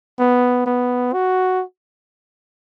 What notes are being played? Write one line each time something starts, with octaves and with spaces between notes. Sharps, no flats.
B3
B3
F#4